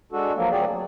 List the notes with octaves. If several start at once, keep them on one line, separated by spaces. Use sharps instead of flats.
G#3 D4 F#4 A4
F3 F#3 A#3
D2 F#3 C4 G#4 D5
F#3